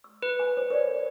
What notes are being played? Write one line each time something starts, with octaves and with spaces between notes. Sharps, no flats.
E6
B4
G#5
C5
A#4 C#5 D5